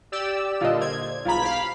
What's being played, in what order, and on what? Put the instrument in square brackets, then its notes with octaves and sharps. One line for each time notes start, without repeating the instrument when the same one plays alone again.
[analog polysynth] G4 D5 E6
[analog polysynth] A#2 D3 [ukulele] F4 D#5
[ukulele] C5 D5 [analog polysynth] G#6
[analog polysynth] B1 B5 [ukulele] F4 G#4 A#5
[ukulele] G4 C5 [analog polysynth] F5 B5